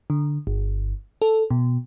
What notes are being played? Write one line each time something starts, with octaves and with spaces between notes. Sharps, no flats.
D3
G1
A4
B2